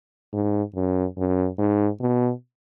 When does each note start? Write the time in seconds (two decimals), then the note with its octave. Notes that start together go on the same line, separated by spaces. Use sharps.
0.33 G#2
0.75 F#2
1.18 F#2
1.59 G#2
2.01 B2